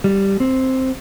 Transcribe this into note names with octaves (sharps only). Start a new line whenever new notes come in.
G3
C4